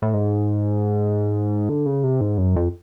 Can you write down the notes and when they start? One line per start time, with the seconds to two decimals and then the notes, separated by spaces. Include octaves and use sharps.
0.02 A2
0.13 G#2
1.69 D3
1.86 C#3
2.04 C3
2.21 G#2
2.38 F#2
2.56 F2